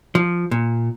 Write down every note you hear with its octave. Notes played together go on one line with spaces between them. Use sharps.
F3
A#2